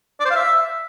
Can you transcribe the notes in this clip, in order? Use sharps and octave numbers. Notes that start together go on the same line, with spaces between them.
D5
C5
F5
E5